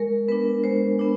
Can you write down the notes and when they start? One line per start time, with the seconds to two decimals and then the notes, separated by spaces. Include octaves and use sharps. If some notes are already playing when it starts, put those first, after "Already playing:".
Already playing: G#3 A#4
0.28 B3 D4 B4
0.64 G#3 C5
0.99 B3 D4